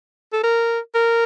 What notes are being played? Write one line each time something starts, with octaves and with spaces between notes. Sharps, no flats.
A4
A#4
A#4